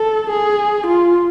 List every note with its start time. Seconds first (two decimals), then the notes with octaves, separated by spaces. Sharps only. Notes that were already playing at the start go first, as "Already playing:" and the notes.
Already playing: A4
0.30 G#4
0.87 F4